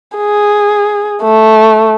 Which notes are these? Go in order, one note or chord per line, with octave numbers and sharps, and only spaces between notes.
G#4
A3